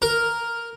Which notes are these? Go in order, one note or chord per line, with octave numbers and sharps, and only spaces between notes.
A#4